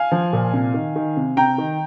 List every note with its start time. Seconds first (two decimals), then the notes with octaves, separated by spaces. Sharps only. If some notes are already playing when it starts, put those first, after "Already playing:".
Already playing: F5 G#5
0.12 F3
0.33 A#2
0.53 C3
0.74 D#3
0.96 D#3
1.17 C3
1.37 C3 G5 A#5
1.58 D#3